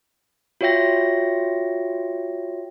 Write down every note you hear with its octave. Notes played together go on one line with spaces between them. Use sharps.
F4 F#4 C#5 E5 G5 A#6